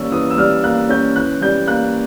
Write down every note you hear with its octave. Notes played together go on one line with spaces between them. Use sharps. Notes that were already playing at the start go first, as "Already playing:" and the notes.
Already playing: E3 G3 A#3 C#4 E6
E3 D#6
E6
G3 F6
A#3 F#6
C#4 G6
E3 F#6
G3 G6
A#3 F#6